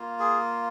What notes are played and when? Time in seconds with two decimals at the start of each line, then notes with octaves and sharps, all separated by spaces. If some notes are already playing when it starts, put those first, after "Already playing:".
Already playing: A#3 F4
0.19 G#4